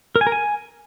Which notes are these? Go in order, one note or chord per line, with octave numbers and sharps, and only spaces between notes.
A#4
G#5
A#4
G#5